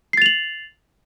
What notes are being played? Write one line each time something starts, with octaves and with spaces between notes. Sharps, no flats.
A6 C7 F7 F#7